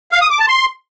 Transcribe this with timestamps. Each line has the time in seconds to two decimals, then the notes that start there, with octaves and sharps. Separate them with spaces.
0.12 F5
0.21 D#6
0.30 D6
0.39 A5
0.48 C6